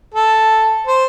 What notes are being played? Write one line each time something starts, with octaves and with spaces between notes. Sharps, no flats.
A4
C5